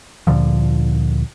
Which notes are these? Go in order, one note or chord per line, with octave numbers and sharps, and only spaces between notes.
D2 A#2 D3 F3